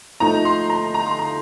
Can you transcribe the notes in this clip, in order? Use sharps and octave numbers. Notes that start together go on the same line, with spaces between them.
F3 A3 D#4 A#5
C6
A#5
A#5
C6
A#5